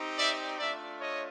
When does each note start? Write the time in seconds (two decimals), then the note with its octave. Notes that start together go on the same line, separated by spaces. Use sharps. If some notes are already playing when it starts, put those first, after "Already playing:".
Already playing: C4 D#4 G4
0.17 D5 E5
0.58 A3 D4 F4 D5 E5
0.99 C#5 D#5